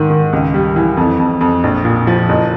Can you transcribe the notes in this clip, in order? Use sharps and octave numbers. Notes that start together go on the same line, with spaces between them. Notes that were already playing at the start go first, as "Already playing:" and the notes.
Already playing: G#2 D#3
D#3
C#2
G3
E3
F2
F2
F2
A#1
A#2
F3
F#1